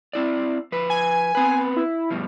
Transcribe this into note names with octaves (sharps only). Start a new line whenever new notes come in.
C4 E4 D5
F3 B4
G#5
B3 C4 B4
E4
G2 B2 F3